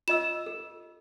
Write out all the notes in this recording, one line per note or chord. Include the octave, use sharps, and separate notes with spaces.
F4 D#5 E6 E7
A4